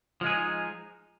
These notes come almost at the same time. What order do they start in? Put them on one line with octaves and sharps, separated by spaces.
F3 G#3 G#4 D#4